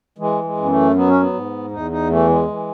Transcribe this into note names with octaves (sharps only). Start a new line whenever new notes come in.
E3 G#3
G#3
F#2
B3
A3
F#3 B3
C#4
B3
G#2
E2 D#4
D#4
E3 A3
G#3
E3